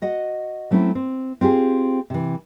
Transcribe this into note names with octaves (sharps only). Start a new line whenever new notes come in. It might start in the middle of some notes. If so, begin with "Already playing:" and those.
F#4 D#5 F#5
F#3 A3 C4 C#4 E4
C4
C4 F4 G4 G#4
C3 E3